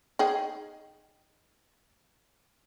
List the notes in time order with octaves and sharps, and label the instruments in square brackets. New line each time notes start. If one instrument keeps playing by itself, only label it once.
[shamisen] D#4 G#4 G5